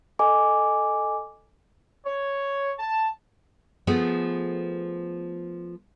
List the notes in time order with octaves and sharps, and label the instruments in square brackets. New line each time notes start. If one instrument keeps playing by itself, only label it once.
[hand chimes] A4 D#5 G#5 D6
[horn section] C#5
A5
[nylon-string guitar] F3 A3 B3 G#4